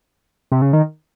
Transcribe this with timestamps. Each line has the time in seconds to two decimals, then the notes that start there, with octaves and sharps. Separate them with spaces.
0.52 C3
0.62 C#3
0.73 D#3